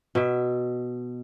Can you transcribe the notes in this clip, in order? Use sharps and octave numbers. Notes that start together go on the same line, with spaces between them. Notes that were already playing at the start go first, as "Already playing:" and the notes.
B2 E5